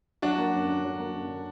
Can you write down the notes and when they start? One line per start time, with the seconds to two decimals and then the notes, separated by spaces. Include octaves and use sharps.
0.22 F#3 D4 F#4
0.38 A#3
0.54 F#2
0.69 D3
0.84 F#3
1.00 A#3
1.14 F#2
1.30 D3